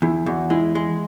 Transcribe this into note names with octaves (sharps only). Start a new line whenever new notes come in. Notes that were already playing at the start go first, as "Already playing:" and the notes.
E2 E4
E2 F#4
G#3 E4
G#3